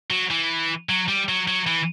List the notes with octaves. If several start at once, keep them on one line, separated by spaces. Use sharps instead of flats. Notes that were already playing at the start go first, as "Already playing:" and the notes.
F#3
E3
F#3
G3
F#3
F#3
E3